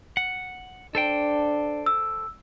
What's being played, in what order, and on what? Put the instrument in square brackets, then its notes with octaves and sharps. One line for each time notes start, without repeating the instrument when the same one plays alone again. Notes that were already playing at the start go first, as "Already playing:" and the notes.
[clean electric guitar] F#5
[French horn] D4 [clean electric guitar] A4 C5 G5
[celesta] E6